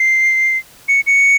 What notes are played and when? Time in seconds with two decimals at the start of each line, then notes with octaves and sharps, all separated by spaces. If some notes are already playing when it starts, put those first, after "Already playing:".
Already playing: C7
0.88 C#7
1.06 C#7